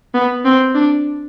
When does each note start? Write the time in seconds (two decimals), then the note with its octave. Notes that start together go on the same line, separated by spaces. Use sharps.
0.14 B3
0.45 C4
0.75 D4